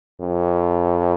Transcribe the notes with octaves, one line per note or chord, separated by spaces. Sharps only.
F2